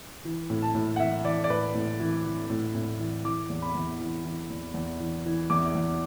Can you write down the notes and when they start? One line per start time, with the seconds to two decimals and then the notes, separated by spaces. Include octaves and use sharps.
0.25 E3
0.50 A2
0.62 A5
0.75 A2
0.96 F#5
1.00 E3 E5
1.24 E3 D5
1.44 D5
1.49 A2 B4
1.74 A2
2.00 E3
2.25 E3
2.50 A2
2.75 A2
3.00 E3
3.24 E3 D6
3.50 E2
3.62 B5
3.75 E2
4.00 E3
4.25 E3
4.50 E2
4.74 E2
5.00 E3
5.25 E3
5.50 E2 D6
5.75 E2